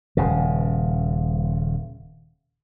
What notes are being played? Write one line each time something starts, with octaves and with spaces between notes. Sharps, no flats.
D#1 C#3